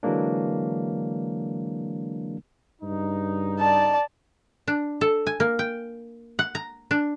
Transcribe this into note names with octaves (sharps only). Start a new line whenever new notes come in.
D3 E3 F#3 G#3 A#3 D4
G2 C#3 D#4
D5 A5
D4
A4
G#5
A#3
G5
F#5
A#5
D4